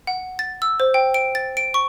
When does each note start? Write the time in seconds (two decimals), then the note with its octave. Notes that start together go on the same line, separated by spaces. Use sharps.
0.07 F#5
0.39 A6
0.62 E6
0.80 C5
0.94 G5
1.14 D7
1.35 A6
1.57 D7
1.74 C#6